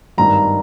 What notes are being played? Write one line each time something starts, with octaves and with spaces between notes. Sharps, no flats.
G#1 G2 D#3 A#5